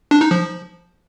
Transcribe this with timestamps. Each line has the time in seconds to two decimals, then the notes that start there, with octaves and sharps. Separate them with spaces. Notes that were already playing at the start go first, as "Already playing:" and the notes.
0.11 D4
0.21 D#4
0.31 F3